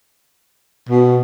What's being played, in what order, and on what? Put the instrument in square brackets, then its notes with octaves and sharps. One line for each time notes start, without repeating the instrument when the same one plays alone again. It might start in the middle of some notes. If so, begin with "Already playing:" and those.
[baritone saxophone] B2